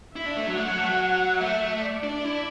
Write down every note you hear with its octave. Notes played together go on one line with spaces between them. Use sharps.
E4 E5
D4
A3
F#3
A3 F#5
F#3
A3
F#3
A3 E5
D5
D4
E4